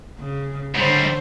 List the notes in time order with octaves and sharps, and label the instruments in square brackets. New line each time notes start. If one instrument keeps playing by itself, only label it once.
[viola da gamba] C#3
[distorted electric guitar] G#2 G3 [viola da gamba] D3 C5 C#5